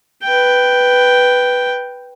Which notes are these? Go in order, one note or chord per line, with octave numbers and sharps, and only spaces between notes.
B4 G5